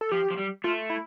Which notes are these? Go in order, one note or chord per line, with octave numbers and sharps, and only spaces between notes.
A4
F3 G4
F3
G3
A3 F4
E4